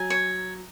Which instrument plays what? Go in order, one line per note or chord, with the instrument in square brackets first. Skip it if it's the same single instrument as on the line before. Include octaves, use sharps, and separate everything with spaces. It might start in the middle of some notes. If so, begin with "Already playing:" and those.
Already playing: [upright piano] F#3 [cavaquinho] G#5
[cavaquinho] C#5